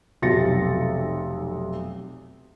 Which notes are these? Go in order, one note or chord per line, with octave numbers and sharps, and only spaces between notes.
F1 B1 C3 A6 A#6 C#7